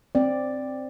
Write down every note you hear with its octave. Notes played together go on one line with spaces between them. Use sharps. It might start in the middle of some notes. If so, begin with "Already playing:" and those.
C4 D5